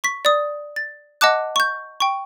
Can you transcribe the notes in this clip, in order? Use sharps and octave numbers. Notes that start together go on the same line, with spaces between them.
C#6 B6
D5 D#6
A6
D#5 F#5 A5 D6 F#6
C#6 G6
G5 C#6